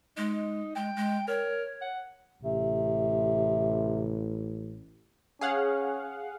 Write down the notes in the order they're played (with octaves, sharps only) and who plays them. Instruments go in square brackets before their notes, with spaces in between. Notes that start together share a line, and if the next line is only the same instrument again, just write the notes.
[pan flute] G#3 [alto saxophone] D#4
[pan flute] G#3 [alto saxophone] G5
[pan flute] G#3
[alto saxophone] A#4 [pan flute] C#5
[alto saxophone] F#5
[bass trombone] A1 [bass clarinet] C3
[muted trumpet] C#4 [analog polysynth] G#4 F5 F#5